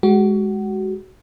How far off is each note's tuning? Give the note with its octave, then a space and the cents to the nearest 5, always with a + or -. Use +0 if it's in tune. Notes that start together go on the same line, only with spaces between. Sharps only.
G#3 +0 F#4 +25